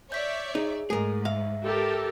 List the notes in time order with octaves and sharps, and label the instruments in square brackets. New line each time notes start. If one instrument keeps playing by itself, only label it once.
[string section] C#5 D5 E5 [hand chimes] G6 B6
[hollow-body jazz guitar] D#4 [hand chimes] G#4
[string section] G#2 [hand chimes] A3 [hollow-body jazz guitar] G#4 A#4
[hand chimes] E5 [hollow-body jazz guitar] F5
[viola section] G4 A4 A#4